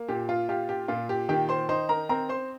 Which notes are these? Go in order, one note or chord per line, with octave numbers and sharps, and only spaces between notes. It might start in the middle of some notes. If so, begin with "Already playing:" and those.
Already playing: A#3
A#2 G4
F4
F4 G4
G4
A#2 F4
G4
D#3 G4 G5
C5 C6
D#4 C5 C6
A#4 A#5
C4 A#4 A#5
C5 C6